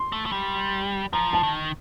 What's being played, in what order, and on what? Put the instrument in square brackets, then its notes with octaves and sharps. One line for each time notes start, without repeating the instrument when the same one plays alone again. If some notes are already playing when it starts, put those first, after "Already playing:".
Already playing: [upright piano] C6
[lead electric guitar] A3
A3
G3
[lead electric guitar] F3 [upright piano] A#5
[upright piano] A5
[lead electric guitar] D#3